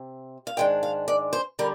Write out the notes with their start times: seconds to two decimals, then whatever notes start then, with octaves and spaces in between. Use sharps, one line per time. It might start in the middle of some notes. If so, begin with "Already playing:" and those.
Already playing: C3
0.47 F5
0.57 G#2 D#3 G#3 D4 G5
0.83 F5
1.08 D5
1.33 C5
1.59 D3 G3 A#4